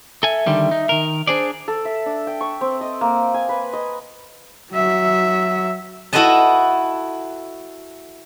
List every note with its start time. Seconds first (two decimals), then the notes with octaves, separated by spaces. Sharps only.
0.23 A4 E5 G#5
0.47 D3 D#3 G3
0.71 D#4
0.89 D#3 A#4
1.27 D4 G#4 C5 D5
1.68 A4
1.85 E5
2.06 D4
2.27 G5
2.40 C#6
2.61 C4
2.81 D#5
3.01 A#3
3.34 G#5
3.49 B4
3.73 D#5
4.71 F#3 E5
6.13 E4 F#4 A4 B4 D#5 A5